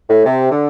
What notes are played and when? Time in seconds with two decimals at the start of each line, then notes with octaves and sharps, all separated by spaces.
0.09 A2
0.26 C3
0.52 D3